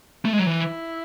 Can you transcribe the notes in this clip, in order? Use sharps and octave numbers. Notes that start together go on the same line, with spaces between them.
A3
G#3
F#3
E3 E4